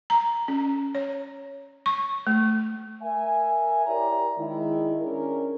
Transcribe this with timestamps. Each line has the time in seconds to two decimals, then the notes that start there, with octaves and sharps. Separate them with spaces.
0.10 A#5
0.48 C#4
0.95 C#5
1.86 C#6
2.27 A3
3.03 A#4 E5 G#5
3.87 E4 G4 A#4 C#5 D5 A#5
4.39 D#3 G#3 E4
5.02 C#4 D4 G#4 A#4